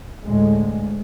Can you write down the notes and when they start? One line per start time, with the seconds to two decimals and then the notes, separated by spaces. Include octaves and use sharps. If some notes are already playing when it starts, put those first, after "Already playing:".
0.24 D2 A2 G#3